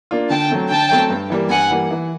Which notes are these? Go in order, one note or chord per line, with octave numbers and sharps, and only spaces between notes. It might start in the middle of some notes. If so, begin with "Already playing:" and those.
A#3 D4 F4
D3 G5 A5
F#3 A3 C4
D3 G5 A5
F#3 A3 C4
G2
E3 G3 A#3
G2 F#5 G#5
E3 G3 A#3
E3